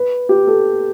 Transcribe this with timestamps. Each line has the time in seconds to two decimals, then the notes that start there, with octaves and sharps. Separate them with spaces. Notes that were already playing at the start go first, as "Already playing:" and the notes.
Already playing: B4
0.29 G4
0.47 A4